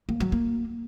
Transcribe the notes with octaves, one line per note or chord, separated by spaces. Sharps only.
A#3
F#3
A#3